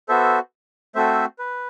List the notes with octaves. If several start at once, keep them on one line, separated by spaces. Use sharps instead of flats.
B3 F#4 A4 C5 E5
A3 C4 F#4 A4 C5 E5
B4